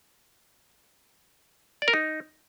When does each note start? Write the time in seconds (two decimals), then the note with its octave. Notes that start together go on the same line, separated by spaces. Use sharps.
1.82 D5
1.88 A#4
1.93 D#4